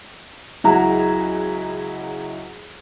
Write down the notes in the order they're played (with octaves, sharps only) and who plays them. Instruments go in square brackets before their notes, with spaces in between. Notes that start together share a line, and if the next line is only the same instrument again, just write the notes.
[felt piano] C#2 F#3 E4 F#4 G#4 A#5